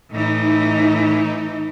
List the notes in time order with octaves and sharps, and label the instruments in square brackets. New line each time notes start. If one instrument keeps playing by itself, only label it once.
[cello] A2 E3 [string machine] D#4